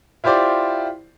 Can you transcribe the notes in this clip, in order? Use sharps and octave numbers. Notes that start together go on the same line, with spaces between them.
E4 F4 G4 C5 D5